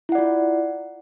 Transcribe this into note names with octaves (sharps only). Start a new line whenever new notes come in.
E4 F4 D5 F#5